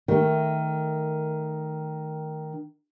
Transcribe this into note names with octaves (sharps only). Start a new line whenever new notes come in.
D#3 A3